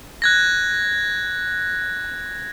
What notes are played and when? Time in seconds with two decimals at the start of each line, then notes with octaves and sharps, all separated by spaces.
0.22 F#6 G#6 A#6